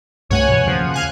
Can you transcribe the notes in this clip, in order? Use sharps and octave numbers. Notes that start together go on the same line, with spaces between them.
C2 G2 A3 C#5 F#5 G#5
B2 E3
D#2 C#3 F3 F#5
F5 G#5 F#6